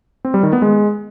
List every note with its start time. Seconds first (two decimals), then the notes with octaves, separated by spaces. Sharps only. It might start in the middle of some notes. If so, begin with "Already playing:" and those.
0.25 C4
0.34 G3
0.43 D#3
0.53 B3
0.62 G#3